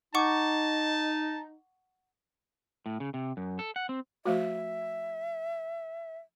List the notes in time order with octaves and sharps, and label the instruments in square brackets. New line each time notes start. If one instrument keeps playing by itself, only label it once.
[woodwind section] D#4 [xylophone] F#5 C#6 D6 [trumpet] A5
[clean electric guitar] A2
C#3
C3
F#2
A4
F#5
C4
[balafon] F3 A3 F#4 [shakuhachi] E5